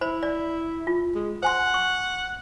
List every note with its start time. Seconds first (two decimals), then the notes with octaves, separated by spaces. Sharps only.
0.01 E4 C5 B5
0.23 D5
0.87 F4
1.15 G#3
1.43 C5 F#5 G#5 C6
1.74 C#6